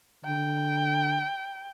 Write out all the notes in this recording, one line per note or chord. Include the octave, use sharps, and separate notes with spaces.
D3 G5